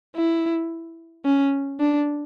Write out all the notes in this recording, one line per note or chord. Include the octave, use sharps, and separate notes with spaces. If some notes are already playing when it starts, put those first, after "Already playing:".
E4
C#4
D4